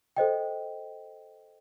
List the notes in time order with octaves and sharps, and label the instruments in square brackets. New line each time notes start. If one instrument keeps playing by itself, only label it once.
[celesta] A4 C5 D#5 G5